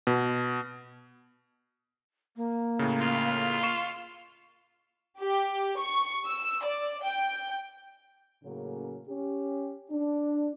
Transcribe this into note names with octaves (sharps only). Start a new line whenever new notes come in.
B2
A#3
A2 C#3
F4
C#6 C7 E7
G4
C#6
E6
D5
G5
A2 C#3 F#3 A#3 C#4
C#4 G4
D4